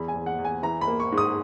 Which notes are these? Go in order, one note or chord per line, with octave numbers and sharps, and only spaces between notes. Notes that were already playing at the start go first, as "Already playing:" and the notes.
Already playing: E2 B5
G#5
E2
F#5
E2
G#5
E3 A#5
B5
A#3
C#6
G#2
D#6